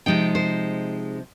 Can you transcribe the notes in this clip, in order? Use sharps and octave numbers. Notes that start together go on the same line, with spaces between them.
C3 F3 G#3 D#4 G5
C5